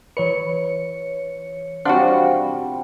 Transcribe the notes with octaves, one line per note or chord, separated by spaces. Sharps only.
E3 B4 C#5 C#7
C3 F3 G3 D4 F#4 C5 F5 F#5